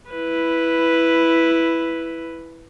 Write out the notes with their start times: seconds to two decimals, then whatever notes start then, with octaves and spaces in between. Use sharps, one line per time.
0.10 E4 B4